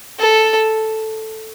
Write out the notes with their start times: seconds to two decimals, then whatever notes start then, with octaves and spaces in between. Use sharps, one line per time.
0.19 A4